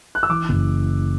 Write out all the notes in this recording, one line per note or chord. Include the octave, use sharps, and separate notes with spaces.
F#6
E6
E3 D6
F#1